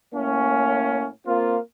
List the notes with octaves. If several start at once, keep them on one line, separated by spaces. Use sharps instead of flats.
A2 A#3 C#4
A#3 C4 F4